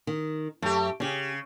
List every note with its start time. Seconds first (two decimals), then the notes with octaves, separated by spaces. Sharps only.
0.07 D#3
0.62 F#2 A3 G4
1.00 C#3 C#4 G4